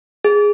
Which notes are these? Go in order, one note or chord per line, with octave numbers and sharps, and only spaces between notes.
G#4